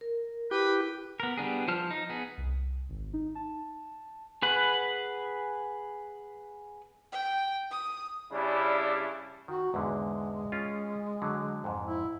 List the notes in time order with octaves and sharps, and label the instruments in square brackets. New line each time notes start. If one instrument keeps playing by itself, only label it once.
[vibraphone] A#4
[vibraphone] E4 [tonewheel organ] G4 [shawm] B4
[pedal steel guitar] B3 A#4
G3 B3 D4 G#4
F3 F4 C5 A5 F6
D#4
B3 G#4
[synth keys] C2
G#1
D#4
A5
[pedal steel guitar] G#4 B4 F#5
[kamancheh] G5
D#6
[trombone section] C#3 G3 D4 E4
[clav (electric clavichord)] D#3 [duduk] F#4
[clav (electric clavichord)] E2 G#2 D3 [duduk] G#3
[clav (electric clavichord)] C#4 F4
D3 F#3
F2 G#2
[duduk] E4